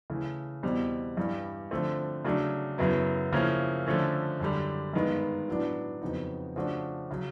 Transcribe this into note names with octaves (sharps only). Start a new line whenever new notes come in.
C#3 E3 A3
E2 B2 G3 C4
G2 E3 G3
D3 F3 A3 C4
C#3 F#3 A3 D4
F#2 C#3 F#3 B3 E4
C#3 F3 A#3 C#4 E4
D3 F3 A3 C#4
F#2 D3 G3
G2 D#3 G#3 B3
A2 F#3 B3 D4
F2 C#3 F#3 B3 D#4
C#3 F3 A3 D4 F#4
C#3 F#3